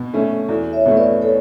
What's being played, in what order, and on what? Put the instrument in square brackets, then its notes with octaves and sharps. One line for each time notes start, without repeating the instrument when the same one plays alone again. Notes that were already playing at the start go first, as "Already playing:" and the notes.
Already playing: [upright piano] B2
A3 C#4
[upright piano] E2 [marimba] F#4 A4
[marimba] C#5 E5
[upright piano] B2 A3
[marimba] B4 D5
A4 C#5